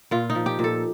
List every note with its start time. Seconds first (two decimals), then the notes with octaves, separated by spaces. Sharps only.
0.11 A#2 F4
0.30 D#4
0.35 F3
0.46 G4
0.59 A#2
0.64 A4